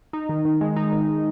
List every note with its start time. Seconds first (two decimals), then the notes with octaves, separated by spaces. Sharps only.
0.13 D#4
0.29 D#3
0.45 D#3
0.61 G#3
0.76 D#4
0.92 D#3
1.08 D#3